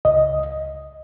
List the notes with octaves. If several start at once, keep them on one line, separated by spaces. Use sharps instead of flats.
C#2 D#5